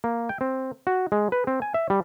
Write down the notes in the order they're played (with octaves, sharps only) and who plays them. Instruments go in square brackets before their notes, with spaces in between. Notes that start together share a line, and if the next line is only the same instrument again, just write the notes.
[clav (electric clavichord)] A#3
G5
C4
F#4
G#3
B4
C4
G#5
E5
G3